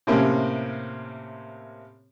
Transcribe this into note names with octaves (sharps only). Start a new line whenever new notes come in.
A2 C3 A#3 C4 C#4